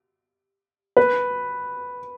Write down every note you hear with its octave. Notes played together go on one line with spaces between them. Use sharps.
B4